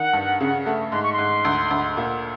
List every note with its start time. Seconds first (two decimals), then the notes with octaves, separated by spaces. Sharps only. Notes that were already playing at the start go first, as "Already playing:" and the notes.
Already playing: D#3 F#5
0.13 G2
0.40 C#3
0.66 A3
0.92 G#2 C6
1.03 C#6
1.13 C6
1.18 G#2
1.45 D2
1.71 D2
1.97 A#2